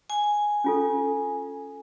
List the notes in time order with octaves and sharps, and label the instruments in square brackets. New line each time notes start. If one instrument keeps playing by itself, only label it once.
[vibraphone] G#5
[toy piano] C#4 F4 A4